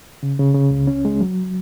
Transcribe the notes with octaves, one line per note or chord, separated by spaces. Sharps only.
C#3
C#3
C#3
C#2
C#4
G#3
F#3